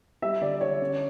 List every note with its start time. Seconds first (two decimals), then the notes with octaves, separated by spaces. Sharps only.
0.22 G3 E5
0.41 D3 D5
0.61 D3 C#5
0.81 C#4